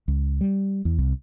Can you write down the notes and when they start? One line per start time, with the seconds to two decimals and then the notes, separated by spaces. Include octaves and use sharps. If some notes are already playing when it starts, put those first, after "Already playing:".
0.08 C#2
0.41 G3
0.85 E2
0.98 C2